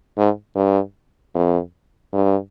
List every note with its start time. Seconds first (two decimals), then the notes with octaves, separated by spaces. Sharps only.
0.17 G#2
0.56 G2
1.35 F2
2.13 G2